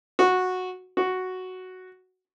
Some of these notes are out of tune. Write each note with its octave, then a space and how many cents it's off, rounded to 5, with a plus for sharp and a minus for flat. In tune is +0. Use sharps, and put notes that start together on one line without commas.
F#4 -10
F#4 +0